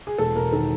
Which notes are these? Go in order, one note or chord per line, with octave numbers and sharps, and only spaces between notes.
G#4
E1 A4
E1 A#4
D#3 A4